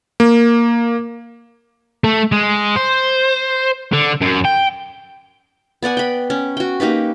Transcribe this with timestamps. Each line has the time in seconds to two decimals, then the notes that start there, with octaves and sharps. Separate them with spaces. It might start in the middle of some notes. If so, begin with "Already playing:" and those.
0.20 A#3
2.04 A3
2.32 G#3
2.76 C5
3.93 D3
4.21 F#2
4.45 G5
5.82 B3 D5 F#5 G#5
5.97 G5 B5
6.30 C#4
6.57 F#4 G5
6.80 A#3 D#4 G4 B4